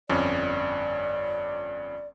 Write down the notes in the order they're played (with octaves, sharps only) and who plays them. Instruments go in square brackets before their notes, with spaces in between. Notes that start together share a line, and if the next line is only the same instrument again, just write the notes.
[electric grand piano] G1 F2 C#4 [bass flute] D5